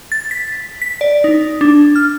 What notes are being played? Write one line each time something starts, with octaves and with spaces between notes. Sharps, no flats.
A6
B6
B6
D5
D#4
D4
F6